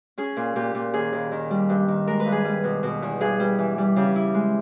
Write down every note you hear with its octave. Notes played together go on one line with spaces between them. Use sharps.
C#4 G#4
A#2
A#2 G4
A#2
D#2 G#4
D#2
D#3
G3
G2
D#3
G#3 A#4
B4
G2
G#4
G3
B2
B2
E2
G2 G#4
G3
E3
G3
C#3 G4
E4
G#3